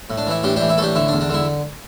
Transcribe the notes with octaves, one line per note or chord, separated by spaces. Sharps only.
A2
D4
E3 E4
A2 D4 G4
E3 D4 G4
E4
A2 D4 G4 A4
D3 E4
D4
E2
D4
D3 E4